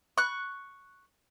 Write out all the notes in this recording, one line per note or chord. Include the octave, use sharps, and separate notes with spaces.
C#6 F#6